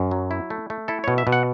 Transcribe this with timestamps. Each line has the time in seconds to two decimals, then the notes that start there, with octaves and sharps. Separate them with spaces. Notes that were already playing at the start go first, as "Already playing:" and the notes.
Already playing: F#2
0.11 F#3
0.31 E4
0.50 A3
0.70 A3
0.88 E4 A4
1.04 B2 C#5
1.18 E5
1.27 B2
1.32 F#5